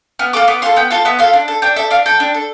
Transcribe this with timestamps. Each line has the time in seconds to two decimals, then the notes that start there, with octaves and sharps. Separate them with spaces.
0.19 B3 F6
0.33 F4 A4 D6
0.48 B3 D6
0.62 F4 A4 C6
0.76 B3 G5
0.90 F4 A4 F5
1.05 B3 E5
1.19 F4 A4 F5
1.33 D4
1.48 A4
1.62 D4 G5
1.76 A4 E5
1.90 D4 F5
2.06 A4 G5
2.20 D4
2.34 A4